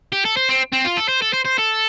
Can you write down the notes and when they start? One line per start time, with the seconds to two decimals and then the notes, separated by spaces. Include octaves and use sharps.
0.12 G4
0.25 A4
0.37 C5
0.49 C4
0.73 C4
0.85 F4
0.97 A4
1.08 C5
1.22 A4
1.33 C5
1.45 C5
1.58 A4